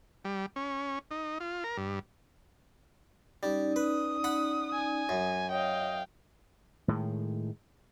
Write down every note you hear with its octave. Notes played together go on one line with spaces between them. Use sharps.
G3
C#4
D#4
F4
A#4
G2
G3 C#4 D#4 D5
B4 D#6
F#5 B5
G#5
F#2
C#5 D#5 F5 G5
A2 D#3 G#3